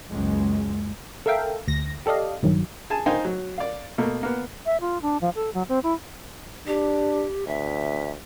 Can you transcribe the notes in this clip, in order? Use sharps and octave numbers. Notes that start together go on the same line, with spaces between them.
F#1 C#2 G#3
A4 A#4 E5 F5 G5
D2 A#6
G4 A4 D5 D#5 F5
A#1 G2 D#3 F#3
G#4 G#5 A5
D#4 C5 F5 G5 G#5
F#3
D5 F5
B2 A3 A#3
A#3 B3
E5
F4
D4
F3
A4
F#3
C4
E4
D4 G4
D2 E5